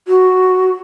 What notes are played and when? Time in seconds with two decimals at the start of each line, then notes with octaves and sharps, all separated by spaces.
0.08 F#4